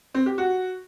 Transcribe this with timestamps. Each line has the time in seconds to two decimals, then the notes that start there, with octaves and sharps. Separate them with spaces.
0.14 C4
0.26 G4
0.38 F#4